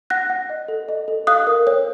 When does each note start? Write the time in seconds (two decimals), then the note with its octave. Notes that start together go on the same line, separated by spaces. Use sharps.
0.10 F#5 F#6 A#6
0.30 F#5
0.50 D#5
0.68 A4
0.89 D#5
1.08 A4
1.27 F5 D#6 F#6
1.47 A#4
1.67 C#5